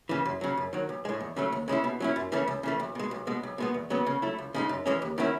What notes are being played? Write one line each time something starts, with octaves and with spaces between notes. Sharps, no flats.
C#3 E3
F#2
C#3 F#3
F#2
D#3 F#3
B1
A2 G#3
E2
C#3 F#3 A3
D#2
C#3 G#3 C#4 E4
B2
F#3 C#4 E4
F#2
C#3 E3 A3 C#4
C#2
C#3 E3 A3
B1
B2 G#3
B1
B2 G#3
B1
B2 G#3 B3
E2
C#3 F#3 B3
C#3
F#3 A3 E4
C#2
C#3 G#3 D#4
F#2
E3 G#3 C#4
D#2
D#3 F#3 C#4 E4